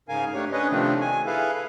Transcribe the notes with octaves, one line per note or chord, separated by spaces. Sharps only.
G#2 C#3 A#4 F5 G#5
A3 D4 G4 C#5
C#4 D4 B4 C#5 D#5
C3 D#3 F3 A3 C4 D4
G#5
E4 G#4 A4 B4 E5 F5